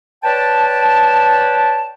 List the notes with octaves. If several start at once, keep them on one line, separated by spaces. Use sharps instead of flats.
B4 C#5 D5 G5 A5